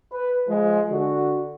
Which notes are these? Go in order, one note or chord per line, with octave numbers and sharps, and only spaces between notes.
B4
F3 G#3
D3 F#4